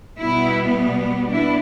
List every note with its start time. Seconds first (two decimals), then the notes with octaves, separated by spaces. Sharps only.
0.19 B2 G3 B3 E4
1.31 B3 D4 E4